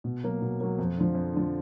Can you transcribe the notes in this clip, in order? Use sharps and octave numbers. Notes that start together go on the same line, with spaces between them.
B2
F#3 A#3
B2
F#3 A#3
F2
D3 F3
F2
D3 F3